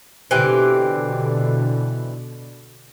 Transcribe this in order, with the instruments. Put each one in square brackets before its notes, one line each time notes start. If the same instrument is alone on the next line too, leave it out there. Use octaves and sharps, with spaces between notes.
[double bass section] B2 D3 [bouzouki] E3 C4 G4